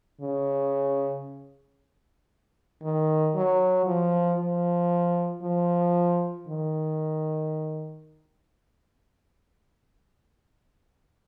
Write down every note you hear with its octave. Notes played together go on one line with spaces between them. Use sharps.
C#3
D#3
F#3
F3
F3
F3
D#3